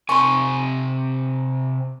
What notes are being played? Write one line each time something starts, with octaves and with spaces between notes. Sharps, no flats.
C3 G#5 C6 C#6